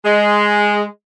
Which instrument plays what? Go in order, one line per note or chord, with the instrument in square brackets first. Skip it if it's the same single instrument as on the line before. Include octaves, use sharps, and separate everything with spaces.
[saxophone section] G#3